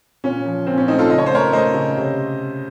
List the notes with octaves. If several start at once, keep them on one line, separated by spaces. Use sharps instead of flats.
A#2 C#4
F3
A#2 C4
C#4
A3 C4 D#4
F4 A4
C#3 D#5
C#5
C5
A3 A#4 C#5
A3 C5 D#5
C#3
C3